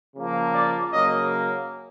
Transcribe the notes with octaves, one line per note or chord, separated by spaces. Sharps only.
C#3 F3 A#3
D5
C#3 F#3 A#3 D#5